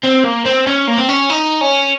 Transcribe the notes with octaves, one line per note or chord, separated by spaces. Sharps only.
C4
A#3
C4
C#4
A#3
C4
C#4
D#4
C#4